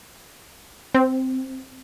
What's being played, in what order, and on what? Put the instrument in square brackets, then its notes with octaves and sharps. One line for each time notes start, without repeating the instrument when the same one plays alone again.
[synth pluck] C4